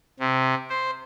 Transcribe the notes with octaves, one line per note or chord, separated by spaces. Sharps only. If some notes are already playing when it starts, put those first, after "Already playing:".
C3
C5